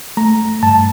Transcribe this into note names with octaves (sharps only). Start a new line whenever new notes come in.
A3 A#5
G2 A5